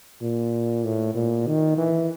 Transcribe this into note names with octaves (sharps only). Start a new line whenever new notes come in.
A#2
A2
A#2
D#3
E3